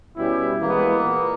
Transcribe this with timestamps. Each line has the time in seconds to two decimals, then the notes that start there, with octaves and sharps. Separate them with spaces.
0.16 B2 G3 C#4 E4 G4
0.61 E3 G#3 A#3 B3
1.05 A#2